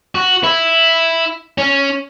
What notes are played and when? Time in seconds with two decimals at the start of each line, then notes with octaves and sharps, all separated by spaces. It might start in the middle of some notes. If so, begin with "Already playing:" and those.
0.15 F#4
0.44 E4
1.58 C#4